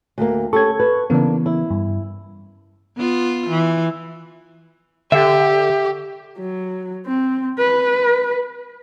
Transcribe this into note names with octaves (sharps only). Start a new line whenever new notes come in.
D2 A#3
C#4 G4 A4 C#6 G#6
B4
C#3 E3 A#3 B3 D4
E4
G2
B3 F4
E3
D3 G4 E5
F#3
C4
B4